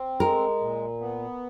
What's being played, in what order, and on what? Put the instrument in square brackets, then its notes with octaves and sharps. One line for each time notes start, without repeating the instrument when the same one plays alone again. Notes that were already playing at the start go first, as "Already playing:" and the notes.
Already playing: [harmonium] C4
[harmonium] G#3 [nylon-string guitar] A#4
[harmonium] A#2
B3